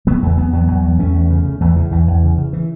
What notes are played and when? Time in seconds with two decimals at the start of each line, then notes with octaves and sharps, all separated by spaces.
0.07 C#3 F#3 B3
0.22 E2 E3 A3
0.37 E2 F#3 B3
0.53 E2 F#3 B3
0.68 E2
0.84 E2
0.99 E2 A3 C#4
1.15 E2
1.30 C#3
1.45 C#3
1.60 E2 E3 A3
1.76 C#3 E3
1.91 E2 E3
2.07 E2
2.23 C#3
2.38 C#3
2.53 E3